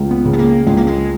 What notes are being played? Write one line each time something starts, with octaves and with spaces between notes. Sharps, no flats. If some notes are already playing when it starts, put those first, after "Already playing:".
Already playing: C#2
B3
C#3
B3
A#3
C#2 G#3
A#3
G#3